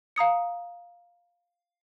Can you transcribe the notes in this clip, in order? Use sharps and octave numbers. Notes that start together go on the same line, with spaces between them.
F5 A#5 D#6 C#7